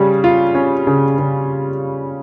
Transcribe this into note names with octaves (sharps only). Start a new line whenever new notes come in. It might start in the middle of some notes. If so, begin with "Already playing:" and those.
Already playing: C#3 G3 C#4
F4
C#4
C#3
C#3